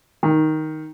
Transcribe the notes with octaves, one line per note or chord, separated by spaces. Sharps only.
D#3